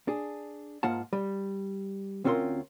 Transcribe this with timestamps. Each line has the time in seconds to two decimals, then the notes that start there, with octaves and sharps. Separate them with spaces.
0.08 D4 G#4
0.83 G#2 A#3 F4 F#5 A5
1.13 G3
2.24 D2 C4 C#4 F4 A#4 C6